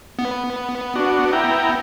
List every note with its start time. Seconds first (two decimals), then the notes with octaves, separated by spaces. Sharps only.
0.19 B3
0.95 D4 F#4
1.33 E4 G5 A#5